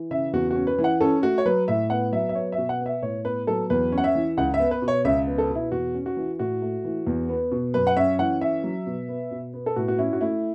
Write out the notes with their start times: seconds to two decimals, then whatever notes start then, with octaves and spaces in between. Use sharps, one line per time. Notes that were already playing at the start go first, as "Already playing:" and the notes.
Already playing: E3
0.11 C#3 E5
0.33 E2 F#4
0.50 F#4
0.56 C#4
0.67 B4
0.78 E3
0.84 F#5
1.01 C#4 A4
1.23 A3 F#4
1.38 C#5
1.46 F#3 B4
1.68 A2 E5
1.90 B3 F#5
2.13 F#3 E5
2.29 E5
2.35 B3 C#5
2.52 E5
2.58 B2
2.69 F#5
2.80 B3
2.86 E5
3.02 A2 C#5
3.25 B3 B4
3.47 F#3 A4
3.70 E2 B4
3.92 C#4
3.98 F#5
4.04 E5
4.15 E3
4.37 C#2 F#5
4.54 E5
4.60 B3
4.71 B4
4.82 B2
4.88 C#5
5.04 C#2 E5
5.27 B3
5.38 A4
5.49 B2
5.55 E4
5.72 E2 F#4
5.95 C#4
6.06 F#4
6.17 E3
6.39 A2 F#4
6.62 A3
6.85 E3
7.07 E2
7.29 B3
7.52 B2
7.74 F#2 B4
7.87 F#5
7.97 C#4 E5
8.19 E3 F#5
8.41 C#4 E5
8.64 F#3
8.86 B2
9.09 B3
9.31 B2
9.54 B3
9.66 A4
9.76 A2 F#4
9.88 F#4
9.98 C#4 E4
10.13 F#4
10.21 A3 E4